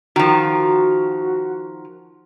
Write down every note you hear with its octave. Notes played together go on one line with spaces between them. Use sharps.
D#3 F3 F#4